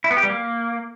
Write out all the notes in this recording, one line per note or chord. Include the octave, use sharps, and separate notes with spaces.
E4
B3
G4
G3
A#3